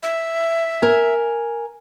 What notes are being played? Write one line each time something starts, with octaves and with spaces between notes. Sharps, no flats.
E5
A#4 G#5